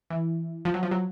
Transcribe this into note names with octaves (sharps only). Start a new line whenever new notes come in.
E3
F3
F#3
F3
F#3